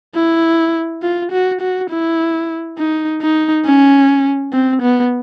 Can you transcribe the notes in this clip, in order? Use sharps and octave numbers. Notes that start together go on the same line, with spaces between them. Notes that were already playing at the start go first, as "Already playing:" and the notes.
E4
F4
F#4
F#4
E4
D#4
D#4
C#4
C4
B3